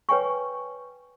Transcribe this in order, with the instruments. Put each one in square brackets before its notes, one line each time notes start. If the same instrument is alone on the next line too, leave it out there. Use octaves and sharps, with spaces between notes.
[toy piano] B4 C#5 G5 G#5 C#6